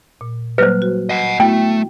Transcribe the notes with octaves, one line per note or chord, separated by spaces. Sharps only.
A#2
F#3 G3 A#3 B4 C5
F#4
D#5 F#5
A3 B3 E4 F#4 G5